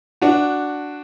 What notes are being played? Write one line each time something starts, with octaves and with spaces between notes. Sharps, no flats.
D4 F#4